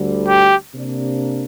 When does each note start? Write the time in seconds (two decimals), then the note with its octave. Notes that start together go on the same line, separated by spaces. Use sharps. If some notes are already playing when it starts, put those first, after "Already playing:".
Already playing: D2 D3 G3
0.28 G4
0.73 C3 A#3 D4